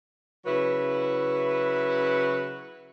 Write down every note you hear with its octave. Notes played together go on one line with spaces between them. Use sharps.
C#3 F#3 E4 B4